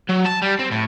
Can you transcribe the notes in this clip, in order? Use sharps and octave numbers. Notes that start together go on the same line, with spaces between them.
F#3
A5
G3
C4
A2